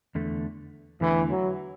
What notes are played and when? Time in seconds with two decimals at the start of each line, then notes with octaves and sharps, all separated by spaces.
0.15 E2 D3 A3
1.01 E2 D3 E3 A3
1.30 F#3